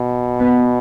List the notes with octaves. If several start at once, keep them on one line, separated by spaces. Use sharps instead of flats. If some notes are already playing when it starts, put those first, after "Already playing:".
Already playing: B2
B3